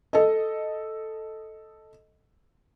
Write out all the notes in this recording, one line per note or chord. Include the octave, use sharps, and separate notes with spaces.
A4 D#5